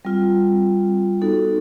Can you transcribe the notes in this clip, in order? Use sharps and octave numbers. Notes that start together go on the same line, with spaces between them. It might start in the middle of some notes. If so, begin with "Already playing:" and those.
G3 C4 F4
B3 D#4 F#4 A4